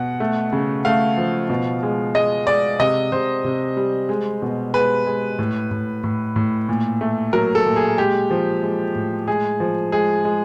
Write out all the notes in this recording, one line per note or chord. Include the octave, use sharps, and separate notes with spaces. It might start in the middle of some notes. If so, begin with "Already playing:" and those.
Already playing: B2 F#5
A3
C#3
A3 F5
F3
B2
G#3
G#3 D#5
G#3 D5
C3 D#5
C3 C5
C3
G3
G#3
B2
G#3 B4
G#3
A2
A2
A2
A2
A#2
A3
F#3 A#4
A4
A#2
G#4
G#3 G4
F3
G#3
A2
G#3 G#4
F3
G#3 G#4
G#3